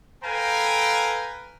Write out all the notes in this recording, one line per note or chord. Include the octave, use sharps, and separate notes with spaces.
A4 B4 F5 G5 G#5 A#5